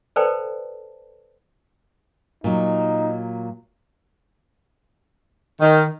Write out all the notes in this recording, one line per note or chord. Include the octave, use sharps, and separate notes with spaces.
A4 B4 C5 D5 G5 A5
A#2 F#3 D#4
D#3